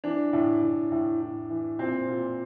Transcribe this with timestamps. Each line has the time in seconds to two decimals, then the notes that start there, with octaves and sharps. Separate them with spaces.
0.04 E3 D4
0.33 A2
0.62 A2
0.92 A2
1.21 A2
1.50 E3
1.79 A#2 C4
2.08 A#2